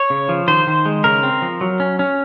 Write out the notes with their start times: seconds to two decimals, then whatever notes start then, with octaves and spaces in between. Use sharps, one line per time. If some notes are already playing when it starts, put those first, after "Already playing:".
Already playing: C#5
0.10 C#3
0.29 F3
0.48 D#3 C5
0.67 D#3
0.86 G#3
1.04 C#3 A#4
1.23 C4
1.42 F3
1.61 F#3
1.80 C#4
1.99 C#4